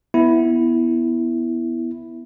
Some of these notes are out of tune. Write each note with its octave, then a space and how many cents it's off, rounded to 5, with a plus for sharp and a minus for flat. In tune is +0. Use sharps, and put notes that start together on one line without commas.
B3 +0 E4 +0